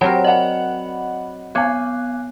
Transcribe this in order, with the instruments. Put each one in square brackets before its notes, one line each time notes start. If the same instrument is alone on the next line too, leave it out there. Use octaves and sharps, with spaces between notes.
[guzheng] F#3 C4 A#4 [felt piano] G4 C#5 G5 [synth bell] B5
[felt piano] D5 F#5 [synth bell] D#5 B5
[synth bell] B3 F#6 [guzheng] C#5 [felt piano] F5 G#5